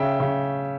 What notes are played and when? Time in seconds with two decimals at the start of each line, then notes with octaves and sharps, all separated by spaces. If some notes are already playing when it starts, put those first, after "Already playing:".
Already playing: C#3 E5 G5
0.20 C#3